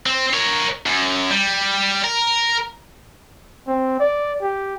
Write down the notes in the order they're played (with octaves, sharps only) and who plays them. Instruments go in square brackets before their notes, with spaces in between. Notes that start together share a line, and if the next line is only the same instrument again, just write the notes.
[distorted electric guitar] C4
A#4 C#5
F#2
G3
A#4
[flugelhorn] C4
D5
G4